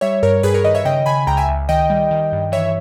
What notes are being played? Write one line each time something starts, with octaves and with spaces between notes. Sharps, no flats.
G3 C#5 E5
G2 A#4 C#5
G2 G#4 B4
A#4 C#5
D#3 B4 D#5
C#5 E5
C#3 D#5 G5
C#3 G#5 B5
C#2 G5 A#5
E5 G#5
C#2
D#3 D#5 G5
G3
D#3
G2
E3 C#5 E5